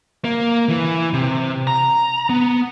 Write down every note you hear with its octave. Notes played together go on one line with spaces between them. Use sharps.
A#3
E3
C3
A#5
B3